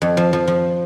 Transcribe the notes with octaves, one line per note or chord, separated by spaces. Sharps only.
F2
F3
F3
F3